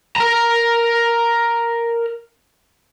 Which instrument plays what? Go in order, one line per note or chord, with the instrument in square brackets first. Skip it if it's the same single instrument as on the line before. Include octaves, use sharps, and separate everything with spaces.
[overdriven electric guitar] A#4 A#5